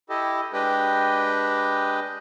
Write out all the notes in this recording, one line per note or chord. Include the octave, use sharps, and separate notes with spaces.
E4 G4 A4 D#5
G#3 D4 G4 B4 D#5 G5